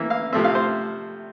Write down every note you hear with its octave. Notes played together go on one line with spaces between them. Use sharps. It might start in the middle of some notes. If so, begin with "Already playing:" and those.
Already playing: E3 A#3 E5
F5
C3 F3 A3 C4 E5
F5
C5